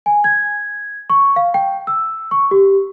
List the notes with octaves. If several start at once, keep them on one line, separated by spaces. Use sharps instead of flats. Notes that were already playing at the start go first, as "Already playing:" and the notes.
G#5
G#6
C#6
F5
G5
E6
C#6
G4